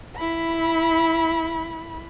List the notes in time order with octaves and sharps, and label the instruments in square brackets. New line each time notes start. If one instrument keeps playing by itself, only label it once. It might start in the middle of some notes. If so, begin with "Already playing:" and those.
[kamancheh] E4 B5